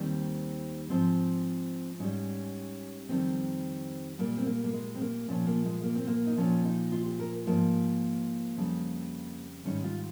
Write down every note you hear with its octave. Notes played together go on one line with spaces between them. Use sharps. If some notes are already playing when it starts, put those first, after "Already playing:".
Already playing: D#2 D#3 G3 C4
G#2 F3 C4
G#2 G3 C#4
F2 D#3 G3 C4
A#2 G3 A#3
C4
A#3
A#3
G#3
C4
A#3
A#2 F3 C#4
A#3
G#3
A#3
C4
A#3
D#4
A#2 F3 C#4
D#4
F4
G4
A#4
G#2 F3 A#3
F2 C#3 G3
G#2 D#3 G3 C#4
F4